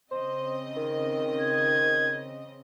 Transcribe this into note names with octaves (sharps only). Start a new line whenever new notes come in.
C#3 C4 C5 D#5
D#3
G#6